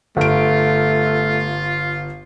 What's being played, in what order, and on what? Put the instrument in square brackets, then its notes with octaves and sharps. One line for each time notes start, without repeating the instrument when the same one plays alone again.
[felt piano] G1 D7 [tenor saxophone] A3 [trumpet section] F4